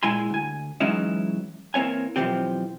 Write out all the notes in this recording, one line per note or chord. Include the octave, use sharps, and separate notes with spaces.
A#2 G#3 E4 G#5 C6
D2 G#5
E3 F#3 G#3 C#4 D#4 E4
E3 A#3 C4 C#5 G#5
B1 F2 E3 F3 C4 G4